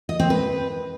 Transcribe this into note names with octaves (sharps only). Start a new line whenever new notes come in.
D#5
C4
B4